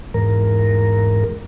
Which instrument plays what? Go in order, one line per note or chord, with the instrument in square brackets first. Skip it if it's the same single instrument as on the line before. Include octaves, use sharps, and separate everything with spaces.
[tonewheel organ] E2 G#2 A#4